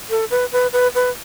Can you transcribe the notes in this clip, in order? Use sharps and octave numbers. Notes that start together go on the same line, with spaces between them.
A4
B4
B4
B4
B4